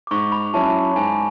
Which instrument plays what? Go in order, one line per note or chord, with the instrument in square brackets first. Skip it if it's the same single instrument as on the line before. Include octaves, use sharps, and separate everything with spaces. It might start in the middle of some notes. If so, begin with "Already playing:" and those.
[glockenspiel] D6
[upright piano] G#2 [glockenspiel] C#6
[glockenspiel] B5
[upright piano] F#3 C#4 E4 [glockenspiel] A5
[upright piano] G#2 [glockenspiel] G#5